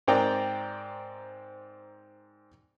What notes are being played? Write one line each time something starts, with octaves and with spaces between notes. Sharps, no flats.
G#2 C4 A#4 D5 G5 A#5